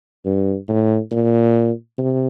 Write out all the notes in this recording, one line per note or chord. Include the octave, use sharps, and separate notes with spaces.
G2
A2
A#2
C3